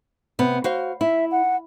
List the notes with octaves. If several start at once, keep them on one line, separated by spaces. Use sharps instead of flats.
C3 B3
F#4 C5 F5
E4 E5
F#5